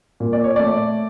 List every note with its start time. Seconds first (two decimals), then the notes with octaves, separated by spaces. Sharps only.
0.20 A#2
0.33 D5
0.44 C#5
0.56 A3 D5